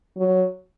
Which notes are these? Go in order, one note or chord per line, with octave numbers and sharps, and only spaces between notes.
F#3